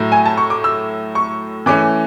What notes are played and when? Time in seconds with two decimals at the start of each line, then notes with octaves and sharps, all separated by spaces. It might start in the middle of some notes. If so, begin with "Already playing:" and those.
Already playing: A2 F#3 A3
0.12 G#5
0.26 A5
0.37 C#6
0.50 D6
0.64 E6
1.15 C#6
1.66 E3 A3 C#4 D6